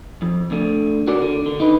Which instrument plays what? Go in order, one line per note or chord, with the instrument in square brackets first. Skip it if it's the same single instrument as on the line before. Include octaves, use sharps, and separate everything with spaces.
[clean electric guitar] F2
D2 D3
F#4 A#4 D5
D3
D3
D#4 B4